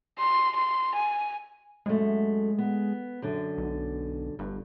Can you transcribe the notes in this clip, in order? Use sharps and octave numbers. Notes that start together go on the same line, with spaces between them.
C6
C6
G#5
F#2 G#3 A3
B3
F#2 D3
B1
G1 G2